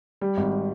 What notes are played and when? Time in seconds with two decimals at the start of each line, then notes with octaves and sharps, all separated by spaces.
0.21 G3
0.37 G#1